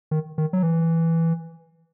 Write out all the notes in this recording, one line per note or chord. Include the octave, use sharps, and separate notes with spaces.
D#3
D#3
F#3
E3